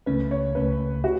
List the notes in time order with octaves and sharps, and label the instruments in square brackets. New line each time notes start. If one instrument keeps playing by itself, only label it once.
[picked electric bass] C#2 C#3 A3 C#4 [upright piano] B4
[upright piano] C#5
[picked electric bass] C#2 C#3 A3 C#4 [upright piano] B4
[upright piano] F#4